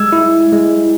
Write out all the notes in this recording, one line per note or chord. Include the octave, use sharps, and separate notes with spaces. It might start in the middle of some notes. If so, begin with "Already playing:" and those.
Already playing: G#3 E6 G#6
E4
G#3